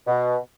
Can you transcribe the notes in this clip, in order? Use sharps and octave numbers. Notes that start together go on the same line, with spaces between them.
B2